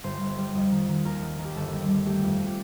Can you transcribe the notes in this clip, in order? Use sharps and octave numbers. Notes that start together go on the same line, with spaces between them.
G1 C5
G1
G3
F2 D#5
D#3
D#3
D#2 A#4
D#3
D#3
G4
G1 A4
G3
G3
A3 G4
F2
G4